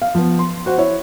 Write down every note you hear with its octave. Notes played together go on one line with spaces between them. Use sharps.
F5
F3 B3
C6
F#4 C5 F#5
E4 C#5